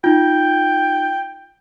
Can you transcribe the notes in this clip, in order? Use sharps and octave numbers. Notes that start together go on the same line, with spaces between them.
D#4 F4 G5